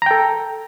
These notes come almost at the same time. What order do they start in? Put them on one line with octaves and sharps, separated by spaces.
A#5 G5 A4